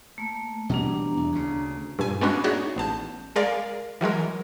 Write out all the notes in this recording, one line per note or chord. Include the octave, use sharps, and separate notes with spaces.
A3 A#3
B2 E3 G3 D4 A#5
E2
D2 C#3
G2 A#2 G#5
G#3 A#3 B3 C#4 D4 F#4
D#4 F#4 G#4 C#5 D5 E5
A1 B3 A5 G6
G#3 G#4 A#4 D5 F5
E3 F#3 G#3 A#4